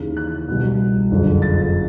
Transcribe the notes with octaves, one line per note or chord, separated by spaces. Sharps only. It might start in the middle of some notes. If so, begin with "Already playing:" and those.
Already playing: D#2 C#3 E3
F#6
C2 B2
F#1 F2 D3 F3
A6